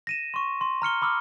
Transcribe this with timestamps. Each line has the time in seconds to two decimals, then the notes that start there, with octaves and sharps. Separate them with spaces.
0.07 A#6 D#7 E7
0.34 C6 C#6
0.61 C6
0.82 A#5 F6 C#7 G7
1.02 B5 D6 E6 F6